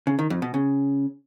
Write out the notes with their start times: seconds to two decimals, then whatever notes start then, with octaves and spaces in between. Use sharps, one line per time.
0.07 C#3
0.19 D#3
0.30 F2
0.42 B2
0.54 C#3